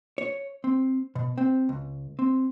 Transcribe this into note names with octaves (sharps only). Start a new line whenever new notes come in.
C#5
C4
B2
C4
C#2
C4